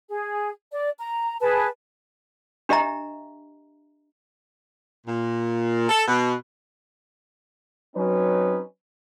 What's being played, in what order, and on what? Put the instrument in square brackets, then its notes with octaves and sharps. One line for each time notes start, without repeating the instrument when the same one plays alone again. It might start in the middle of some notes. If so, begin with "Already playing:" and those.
[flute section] G#4
D5
A#5
G#4 B4 A5
[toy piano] D4 G4 D#5 E5 A#5
[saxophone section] A#2
A4
B2
[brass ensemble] F#3 C4 C#4 D#4 B4 C#5